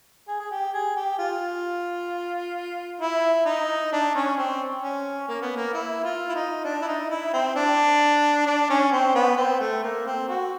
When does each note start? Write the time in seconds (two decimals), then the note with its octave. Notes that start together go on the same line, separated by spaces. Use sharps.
0.28 G#4
0.40 G#4
0.51 G4
0.74 G#4
0.96 G4
1.19 F4
3.01 E4
3.46 D#4
3.92 D4
4.15 C#4
4.38 C4
4.82 C#4
5.28 A#3
5.42 B3
5.56 A#3
5.73 E4
6.04 F4
6.29 E4
6.35 D#4
6.64 D4
6.82 E4
6.87 D#4
7.10 E4
7.33 C4
7.56 D4
8.46 D4
8.70 C#4
8.92 C4
9.15 B3
9.37 C4
9.60 A3
9.83 A#3
10.06 C4
10.28 F#4